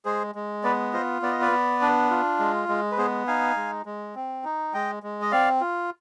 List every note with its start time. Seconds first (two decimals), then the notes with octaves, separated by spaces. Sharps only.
0.05 G#3 G#4 C5
0.35 G#3
0.64 B3 B4 D5
0.93 F4 C5 D#5
1.22 B3 D5
1.32 D#5
1.41 B4 D5
1.51 B3
1.82 D4
2.10 F4
2.39 G#3
2.69 G#3
2.92 B4
2.98 B3 G#4 C5
3.27 D#4 F5 G#5
3.57 G#3
3.86 G#3
4.15 C4
4.44 D#4
4.73 G#3 D#5 G5
5.03 G#3
5.22 D#5
5.31 C4 D5 F5
5.61 F4